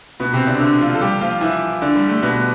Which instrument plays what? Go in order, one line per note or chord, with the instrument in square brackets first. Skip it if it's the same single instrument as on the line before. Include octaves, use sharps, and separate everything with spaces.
[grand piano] B2 B3
C3 C4
D3 D4
D3 D4
F3 F4
A4
G3 G4
F3 F4
E3 E4
D3 D4
G3
A3
B2 B3